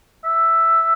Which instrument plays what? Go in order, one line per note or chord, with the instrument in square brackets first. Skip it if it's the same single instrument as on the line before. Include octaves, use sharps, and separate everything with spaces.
[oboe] E5